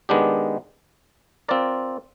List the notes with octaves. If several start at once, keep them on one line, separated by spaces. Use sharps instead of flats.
D#3 G#3 B3 D4 G4
C4 F4 A#4 D5